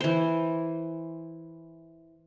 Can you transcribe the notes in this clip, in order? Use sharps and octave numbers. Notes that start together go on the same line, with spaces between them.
E3 C5